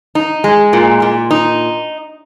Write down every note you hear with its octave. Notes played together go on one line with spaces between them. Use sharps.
D#4
G#3
A#2
A#2
D#4